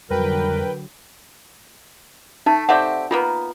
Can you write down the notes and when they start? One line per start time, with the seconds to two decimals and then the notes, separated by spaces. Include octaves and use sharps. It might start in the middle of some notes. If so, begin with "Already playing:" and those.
0.10 F2 D3 F#3 G3 A#4 B4 G5
2.46 A3 D#4 A5
2.69 A3 C4 G4 D5 E5 F#5
3.11 D#3 A#3 B3 F4